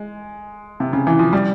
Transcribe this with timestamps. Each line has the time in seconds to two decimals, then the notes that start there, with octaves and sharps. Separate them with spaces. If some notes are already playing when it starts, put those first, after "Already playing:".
Already playing: G#3
0.80 C3
0.93 C#3
1.07 E3
1.19 F3
1.33 G3